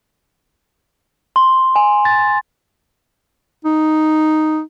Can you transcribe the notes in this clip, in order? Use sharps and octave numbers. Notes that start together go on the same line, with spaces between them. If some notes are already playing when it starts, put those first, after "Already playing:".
C6
G#5
A6
D#4